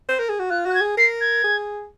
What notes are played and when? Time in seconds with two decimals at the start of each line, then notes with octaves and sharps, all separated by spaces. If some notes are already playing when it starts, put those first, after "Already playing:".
0.09 C5
0.20 A#4
0.29 G#4
0.39 F#4
0.50 F4 F#6
0.66 F#4 F#6
0.74 G#6
0.81 G#4
0.97 A#4 C7
1.20 G#6
1.44 G#4